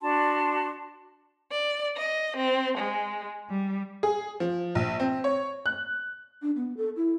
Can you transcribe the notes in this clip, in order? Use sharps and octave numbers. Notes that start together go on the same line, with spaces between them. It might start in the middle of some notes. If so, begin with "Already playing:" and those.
D4 F#4 A5 C6
D5
D#5
C4
G#3
G3
G#4
F3
A#1
C4
C#5
F#6
D4
B3
A4
E4